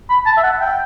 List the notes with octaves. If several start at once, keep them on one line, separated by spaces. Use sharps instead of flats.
B5
A5
E5
F#5
G5